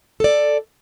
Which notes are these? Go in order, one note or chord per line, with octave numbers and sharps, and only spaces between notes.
A4 D5